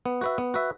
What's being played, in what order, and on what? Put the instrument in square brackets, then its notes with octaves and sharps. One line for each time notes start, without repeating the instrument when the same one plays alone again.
[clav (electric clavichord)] B3
F#4 B4 E5
B3
F#4 B4 E5